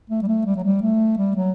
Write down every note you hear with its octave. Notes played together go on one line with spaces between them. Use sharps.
A3
G3
A3
G3
F#3
G3
A3
G3
F#3